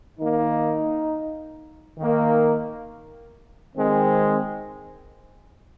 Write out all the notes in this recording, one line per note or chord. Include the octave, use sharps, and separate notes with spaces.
D#3 A#3 D#4
D#3 A#3
D#3 G#3 C4